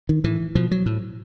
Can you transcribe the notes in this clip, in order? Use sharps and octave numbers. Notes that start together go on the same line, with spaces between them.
D#3
A2 E3
B2 F3
F#3
A2